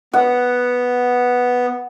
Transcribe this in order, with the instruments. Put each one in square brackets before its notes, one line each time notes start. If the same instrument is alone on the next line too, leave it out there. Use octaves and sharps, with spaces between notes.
[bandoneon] B3 [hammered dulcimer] F#5